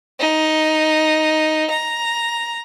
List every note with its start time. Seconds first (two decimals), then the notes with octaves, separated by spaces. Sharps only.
0.20 D#4
1.71 A#5